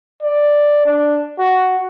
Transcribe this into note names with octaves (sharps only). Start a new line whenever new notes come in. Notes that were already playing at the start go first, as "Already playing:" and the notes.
D5
D4
F#4